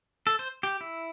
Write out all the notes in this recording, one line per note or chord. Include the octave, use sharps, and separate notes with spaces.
A4
C5
G4
E4